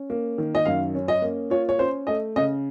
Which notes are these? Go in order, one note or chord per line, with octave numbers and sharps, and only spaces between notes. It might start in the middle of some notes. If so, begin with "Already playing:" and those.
Already playing: C#4
A#3
D#3
D#5
F#2 F5
C#4
D#5
A#3
F4 C#5
C#5
C#4 C5
A3 D#5
C#3 D#5